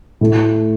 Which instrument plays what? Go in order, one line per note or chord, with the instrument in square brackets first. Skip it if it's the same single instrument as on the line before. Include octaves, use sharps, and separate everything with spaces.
[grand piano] A2 A3